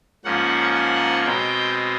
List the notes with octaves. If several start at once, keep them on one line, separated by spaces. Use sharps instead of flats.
G#2 F3 A#3 C#4 F#5
F#5
B2 G#3 C4 G5